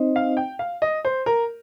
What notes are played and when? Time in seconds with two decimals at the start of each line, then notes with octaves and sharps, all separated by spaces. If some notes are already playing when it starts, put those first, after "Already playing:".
Already playing: C4 D#4 C5 D#5
0.16 F5
0.37 G5
0.59 F5
0.82 D#5
1.05 C5
1.26 A#4